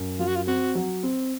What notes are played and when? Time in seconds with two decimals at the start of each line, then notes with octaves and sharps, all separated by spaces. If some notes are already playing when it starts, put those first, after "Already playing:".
Already playing: F#2
0.19 F#3 F4
0.28 F#4
0.36 F4
0.47 C4 F#4
0.75 F#3
1.03 C4